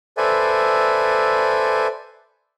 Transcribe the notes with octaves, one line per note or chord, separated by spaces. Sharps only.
A4 B4 C5 D5 E5 G#5